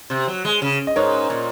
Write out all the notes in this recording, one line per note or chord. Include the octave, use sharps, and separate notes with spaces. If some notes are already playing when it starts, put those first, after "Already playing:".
C3
F#3
G#3
C#3
D#5
G#2 A#4 C#5
A#2